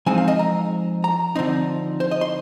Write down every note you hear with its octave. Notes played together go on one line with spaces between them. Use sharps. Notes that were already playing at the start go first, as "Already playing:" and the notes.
F3 G#3 C4 D#4 G#5
F5
D#5
A#5
A#5
D3 F3 C4 D#4
C5
D#5
C6